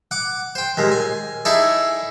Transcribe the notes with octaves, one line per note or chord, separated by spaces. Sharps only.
F#5 D6
C5 G5
D#2 A#2 G#3
G#5
D#4 E4 G#4 A4 D5